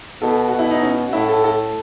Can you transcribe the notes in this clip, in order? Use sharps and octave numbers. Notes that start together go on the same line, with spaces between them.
B2 A4
B2 F#4
E4
D#4
C#4
F#4
A2 E4
A4
A4